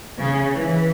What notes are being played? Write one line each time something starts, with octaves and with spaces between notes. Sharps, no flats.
C#3
E3